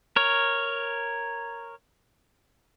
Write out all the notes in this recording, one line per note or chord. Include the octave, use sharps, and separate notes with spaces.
A#4 C#5